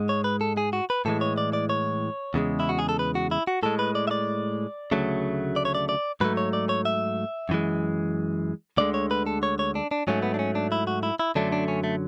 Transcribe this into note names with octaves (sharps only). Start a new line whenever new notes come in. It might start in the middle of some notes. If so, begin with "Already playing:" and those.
Already playing: G#2 G#3
C#5
B4
A4
G#4
F#4
B4
A2 E3 G#3 A4
C#5
D5
D5
C#5
E2 C#3 G#3
E4
F#4
G#4
A4
B4
F#4
E4
F#4
A2 G#3 A4
B4
D5
E5
D5
D2 C#3 F#3 A3
D5
C#5
D5
D5
G#2 F#3 A3 B4
C#5
D5
C#5
E5
F#2 E3 G#3
D2 D3 G#3 D5
C#5
B4
A4
C#5
C#5
D4
D4
G#2 F#3 A3 C#4
B3
D4
C#4
D4
E4
F#4
E4
E4
F#2 D3 F#3 A3 D4
D4
C#4
A3